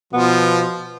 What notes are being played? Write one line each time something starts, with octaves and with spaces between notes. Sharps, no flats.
B2 F3 B3